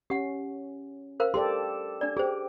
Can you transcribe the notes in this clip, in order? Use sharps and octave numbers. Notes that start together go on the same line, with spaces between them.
C#4 G4 F#5
A#4 C5 F5
G4 A4 D5 C6
D4 D5
G4 G#4 C5